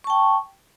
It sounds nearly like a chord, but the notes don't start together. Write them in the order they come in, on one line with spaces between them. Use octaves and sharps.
C#6 A5 G5